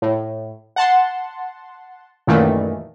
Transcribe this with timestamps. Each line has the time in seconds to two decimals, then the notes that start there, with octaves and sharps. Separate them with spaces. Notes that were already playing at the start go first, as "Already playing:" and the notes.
0.02 A2
0.76 F#5 A5 C6
2.27 F#2 A#2 D#3 E3 A3